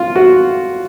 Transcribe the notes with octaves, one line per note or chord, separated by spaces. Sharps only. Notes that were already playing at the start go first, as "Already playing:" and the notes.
Already playing: F4
F#4